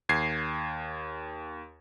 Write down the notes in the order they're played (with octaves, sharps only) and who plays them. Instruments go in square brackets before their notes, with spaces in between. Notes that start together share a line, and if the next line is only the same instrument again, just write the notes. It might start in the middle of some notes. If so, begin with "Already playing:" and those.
[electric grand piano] D#2 G#6 C7